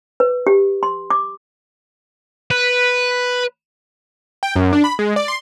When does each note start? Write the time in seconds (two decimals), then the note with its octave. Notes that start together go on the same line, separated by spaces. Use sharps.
0.20 B4
0.47 G4
0.83 C6
1.10 D6
2.50 B4
4.43 G5
4.56 F#2
4.73 D4
4.84 B5
4.99 G#3
5.16 D5
5.28 C6